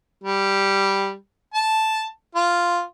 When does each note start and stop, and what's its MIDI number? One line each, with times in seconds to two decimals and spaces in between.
0.24 1.13 55
1.54 2.04 81
2.35 2.81 65